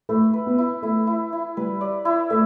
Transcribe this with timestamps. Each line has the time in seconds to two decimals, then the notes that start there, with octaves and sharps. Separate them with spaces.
0.09 A3 E4
0.33 B4
0.46 B3
0.58 E4
0.82 A3 E4
1.07 E4
1.33 E4
1.57 G3 B4
1.81 D5
2.05 E4
2.30 A3 E5